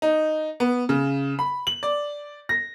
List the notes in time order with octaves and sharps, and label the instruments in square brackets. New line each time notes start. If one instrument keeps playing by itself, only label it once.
[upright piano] D#4
B3
C#3
B5
F#7
D5
A#6